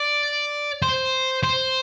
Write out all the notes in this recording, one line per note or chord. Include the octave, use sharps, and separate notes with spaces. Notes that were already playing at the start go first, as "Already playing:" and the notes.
Already playing: D5
C5
C5